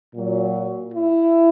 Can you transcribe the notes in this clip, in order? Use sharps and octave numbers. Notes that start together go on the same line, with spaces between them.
A#2 F#3
E4